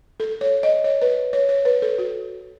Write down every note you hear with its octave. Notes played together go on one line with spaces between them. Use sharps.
A4
C#5
D#5
C#5
B4
C#5
C#5
B4
A4
F#4